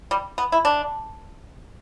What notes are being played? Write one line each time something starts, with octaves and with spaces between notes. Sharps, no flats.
G3
B3
E4
D4